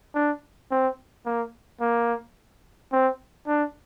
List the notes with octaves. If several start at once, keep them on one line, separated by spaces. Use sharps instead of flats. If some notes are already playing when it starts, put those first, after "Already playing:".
D4
C4
A#3
A#3
C4
D4